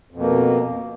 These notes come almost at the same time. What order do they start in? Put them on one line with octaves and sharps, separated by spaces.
F2 B2 A#3